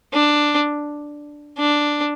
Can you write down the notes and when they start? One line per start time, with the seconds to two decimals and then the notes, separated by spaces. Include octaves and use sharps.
0.13 D4
1.58 D4